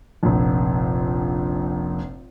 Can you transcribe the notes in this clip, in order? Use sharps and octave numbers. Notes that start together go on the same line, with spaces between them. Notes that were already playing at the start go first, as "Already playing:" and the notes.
F1 A#1